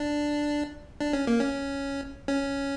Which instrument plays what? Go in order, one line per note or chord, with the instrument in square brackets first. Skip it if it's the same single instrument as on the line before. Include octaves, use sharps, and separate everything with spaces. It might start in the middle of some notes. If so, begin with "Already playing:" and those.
Already playing: [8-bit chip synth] D4
D4
C#4
A#3
C#4
C#4